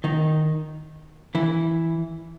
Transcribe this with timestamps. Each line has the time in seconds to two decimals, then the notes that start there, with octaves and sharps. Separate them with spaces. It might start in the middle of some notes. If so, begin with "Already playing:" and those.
0.04 D#3 D#4
1.35 E3 E4